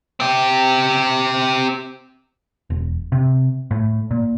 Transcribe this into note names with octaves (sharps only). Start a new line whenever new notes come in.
C4 G4
E1
C3
A2
A#2